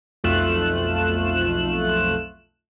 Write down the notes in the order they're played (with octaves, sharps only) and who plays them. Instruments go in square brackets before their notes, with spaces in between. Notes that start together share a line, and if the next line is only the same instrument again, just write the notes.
[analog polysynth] B1 F2 A3 F4 F#6 E7